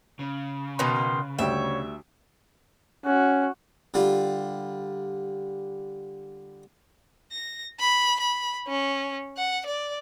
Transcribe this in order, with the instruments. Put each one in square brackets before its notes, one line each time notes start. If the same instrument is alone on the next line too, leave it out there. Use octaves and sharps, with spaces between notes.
[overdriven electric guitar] C#3
[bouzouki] B2 D#3 [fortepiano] B4 [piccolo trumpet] C6
[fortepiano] D2 G3 G5 [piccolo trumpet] C#5 [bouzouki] E5
[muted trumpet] C#4 [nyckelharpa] F#4
[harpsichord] D3 G3 F4
[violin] A#6
B5
B5
C#4
F#5
D5